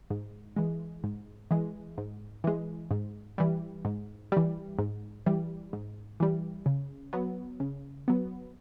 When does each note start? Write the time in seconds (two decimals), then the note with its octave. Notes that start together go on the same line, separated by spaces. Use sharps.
0.10 G#2
0.56 E3 G#3
1.04 G#2
1.51 E3 G#3
1.98 G#2
2.44 E3 G#3
2.91 G#2
3.38 E3 G3
3.85 G#2
4.32 E3 G3
4.79 G#2
5.26 E3 G3
5.73 G#2
6.20 E3 G3
6.66 C#3
7.13 F#3 B3
7.60 C#3
8.08 F#3 B3